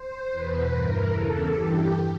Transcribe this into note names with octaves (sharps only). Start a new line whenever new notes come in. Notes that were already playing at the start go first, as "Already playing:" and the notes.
Already playing: C5
E2 B2 B4
G2 E3 A#4
E2 C#3 E3 A4
G2 E3 G4